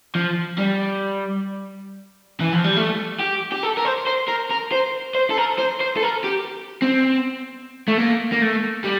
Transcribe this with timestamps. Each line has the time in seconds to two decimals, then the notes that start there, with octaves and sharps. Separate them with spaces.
0.15 F3
0.58 G3
2.40 E3
2.53 F3
2.64 G3
2.76 A3
3.20 G4
3.52 G4
3.63 A4
3.77 A#4
3.85 C5
4.07 C5
4.28 A#4
4.50 A#4
4.72 C5
5.15 C5
5.30 A4
5.37 A#4
5.58 C5
5.80 C5
5.97 A4
6.03 A#4
6.24 G4
6.82 C4
7.88 A3
7.98 A#3
8.32 A#3
8.42 A3
8.84 G3